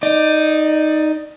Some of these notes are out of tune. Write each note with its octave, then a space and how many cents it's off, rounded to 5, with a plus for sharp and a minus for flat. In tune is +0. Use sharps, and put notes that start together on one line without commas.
D#4 +0 D5 +20